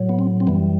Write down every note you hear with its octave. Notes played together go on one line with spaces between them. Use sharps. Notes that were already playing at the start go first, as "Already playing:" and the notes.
Already playing: A2 F#3
B3
C4
C4
F#2 E3 G3 B3